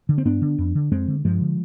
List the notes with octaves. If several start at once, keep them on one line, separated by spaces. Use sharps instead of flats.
D3
C4
G2 B3 D4
D3
F2
D3
F2 G#3 C4
D3
G2 F3 G#3
D3